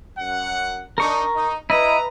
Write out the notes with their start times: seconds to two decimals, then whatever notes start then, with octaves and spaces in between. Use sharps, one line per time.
0.18 F#2 F#5
0.98 D4 D#4 A#4 C#6
1.35 D#4
1.70 E4 B4 D#5 A#5